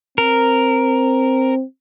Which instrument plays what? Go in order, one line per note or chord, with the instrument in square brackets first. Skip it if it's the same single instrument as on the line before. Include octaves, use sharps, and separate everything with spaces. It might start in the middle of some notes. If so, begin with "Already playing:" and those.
[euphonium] C4 [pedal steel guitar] A#4